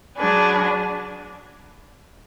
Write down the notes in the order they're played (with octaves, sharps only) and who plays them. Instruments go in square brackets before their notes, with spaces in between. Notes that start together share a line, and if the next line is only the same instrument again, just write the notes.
[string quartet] F#3 D4 G#4 B4